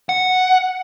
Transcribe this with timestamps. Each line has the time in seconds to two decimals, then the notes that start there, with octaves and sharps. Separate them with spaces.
0.09 F#5